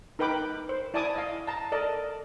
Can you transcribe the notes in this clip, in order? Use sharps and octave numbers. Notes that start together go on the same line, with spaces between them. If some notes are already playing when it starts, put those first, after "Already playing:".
D#4 A#4 B4 G5 B5 D6
C5
E4 D5 G#5 A5 D6 D#6
D#5 F5
A5 A#5
A4 A#4 D5 D#5 A5